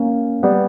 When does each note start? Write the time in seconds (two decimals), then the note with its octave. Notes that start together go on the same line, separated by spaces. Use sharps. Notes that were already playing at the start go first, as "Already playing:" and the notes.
Already playing: A#3 C#4
0.43 G3 B3